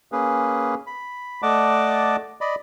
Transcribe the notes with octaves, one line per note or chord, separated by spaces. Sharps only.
A#3 C#4 G#4 B4
B5
A3 D5 D#5 F#5 A5 D6
D5 D#5 B5